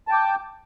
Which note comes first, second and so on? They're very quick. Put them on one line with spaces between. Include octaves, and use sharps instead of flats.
A5 G5 D6